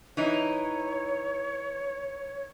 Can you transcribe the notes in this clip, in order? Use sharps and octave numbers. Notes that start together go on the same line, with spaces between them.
E3 D#4 C#5